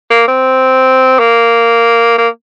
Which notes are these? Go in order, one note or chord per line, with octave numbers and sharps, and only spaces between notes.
A#3
C4
A#3
A#3